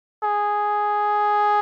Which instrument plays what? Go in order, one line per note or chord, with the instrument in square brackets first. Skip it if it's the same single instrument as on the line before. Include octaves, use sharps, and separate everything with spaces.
[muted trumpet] G#4